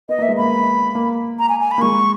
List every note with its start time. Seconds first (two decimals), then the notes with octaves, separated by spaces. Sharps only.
0.09 B3 D#5
0.19 A#3 E5
0.29 G#3
0.37 A#3 B5
0.95 A#3
1.39 A#5
1.49 G#5
1.60 G#5
1.71 B5
1.78 A#3
1.81 G#3 C#6